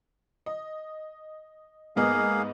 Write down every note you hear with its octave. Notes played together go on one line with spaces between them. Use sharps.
D#5
G#2 A#3 B3 G#4 D#5 F5